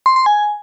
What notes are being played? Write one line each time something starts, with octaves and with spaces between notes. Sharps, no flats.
C6
C6
G#5